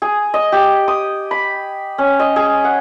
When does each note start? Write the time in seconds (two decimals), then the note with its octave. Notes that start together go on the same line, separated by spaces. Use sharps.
0.02 G#4
0.34 D#5
0.52 G4
0.88 D#6
1.31 B5
1.98 C#4
2.20 D#5
2.36 G#4
2.64 F#5